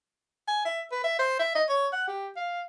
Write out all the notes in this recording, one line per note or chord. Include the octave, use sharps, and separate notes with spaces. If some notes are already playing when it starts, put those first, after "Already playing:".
G#5
E5
B4
E5
C5
E5
D#5
C#5
F#5
G4
F5